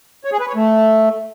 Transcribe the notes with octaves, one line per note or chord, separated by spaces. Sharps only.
C#5
G#4
B4
C#5
A3